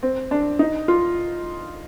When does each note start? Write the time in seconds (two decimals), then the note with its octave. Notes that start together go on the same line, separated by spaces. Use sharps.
0.03 C4
0.31 D4
0.59 D#4
0.88 F4